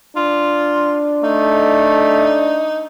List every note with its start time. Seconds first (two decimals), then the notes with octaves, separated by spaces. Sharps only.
0.16 D4 F4
1.24 A3 D#4